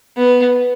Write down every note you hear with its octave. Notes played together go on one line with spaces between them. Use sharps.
B3